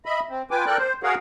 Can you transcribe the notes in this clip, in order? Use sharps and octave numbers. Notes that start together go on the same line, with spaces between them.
D#5 E5 B5
C4
F4 B4 G5 G#5 D6
A4 A#4 D5 G5 F#6
C5
F#4 G#4 A#4 C#5 F5 F#5